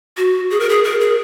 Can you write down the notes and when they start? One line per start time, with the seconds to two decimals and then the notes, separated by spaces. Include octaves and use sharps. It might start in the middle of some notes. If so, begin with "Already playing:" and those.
0.17 F#4
0.51 G#4
0.60 A#4
0.69 G#4
0.84 A#4
1.00 G#4